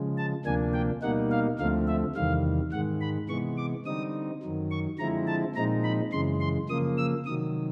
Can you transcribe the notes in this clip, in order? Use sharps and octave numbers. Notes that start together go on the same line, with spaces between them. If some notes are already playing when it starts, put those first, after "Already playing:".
Already playing: C#3 F3 G#3
A5
D2 C3 F3 A#3 D4 G#5
G5
B2 G3 A#3 D#4 F#5
F5
D2 D3 F3 A3 C4 F5
E5
E2 C3 D#3 G3 F5
G#2 D#3 G#3 F#5
B5
C3 E3 G#3 B3 C#6
D6
D3 G3 C4 D#4 D#6
F#2 D#3 F#3
C#6
D3 F3 G#3 C4 E4 A#5
A5
A#2 F3 G#3 C4 D#4 A#5
B5
F#2 C#3 E3 G#3 C6
C6
C#3 F3 A#3 D#6
E6
C3 D#3 F#3 D#6